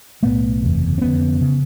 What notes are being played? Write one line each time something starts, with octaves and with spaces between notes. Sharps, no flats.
B1 A2 A3 B3
F#1 E2 C3
C4
F1 F2 D3 B3 C#4
C#3